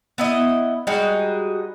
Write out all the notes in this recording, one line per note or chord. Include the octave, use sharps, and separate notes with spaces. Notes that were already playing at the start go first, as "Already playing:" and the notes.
B3 E4 D#5
G3 G#3 D#4 F#4